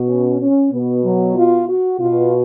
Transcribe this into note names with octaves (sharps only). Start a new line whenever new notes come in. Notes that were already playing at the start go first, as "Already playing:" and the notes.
Already playing: B2
C#4
C#4
B2 B3
F#3
F4
F#4
B2 F4